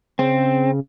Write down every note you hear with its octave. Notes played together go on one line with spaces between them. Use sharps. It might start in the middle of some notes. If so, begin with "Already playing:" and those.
C#3 C4